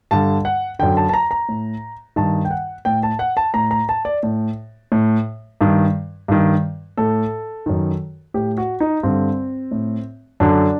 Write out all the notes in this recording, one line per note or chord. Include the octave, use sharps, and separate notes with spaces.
G2 D3 A5
F#5
F#2 D3 G5
A5
A5
A#5
A#5
A2
G2 D#3 A5
G5
F#5
A2 G5
A5
F#5
A5
A2 A#5
A#5
A5
D5
A2
A2
G2 D#3
G2 D#3
A2 A4
F#2 D#3
A2 G4
F#4
D#4
G2 D3 C4
A2
F#2 D3 D4